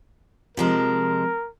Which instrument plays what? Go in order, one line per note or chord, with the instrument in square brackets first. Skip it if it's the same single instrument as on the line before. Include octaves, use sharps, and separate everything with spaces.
[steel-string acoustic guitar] C3 F3 G#3 [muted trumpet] A#4